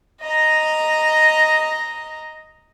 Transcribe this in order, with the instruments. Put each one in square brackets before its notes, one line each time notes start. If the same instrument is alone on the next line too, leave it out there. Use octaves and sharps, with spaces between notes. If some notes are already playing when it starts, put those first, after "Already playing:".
[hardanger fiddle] D#5 A#5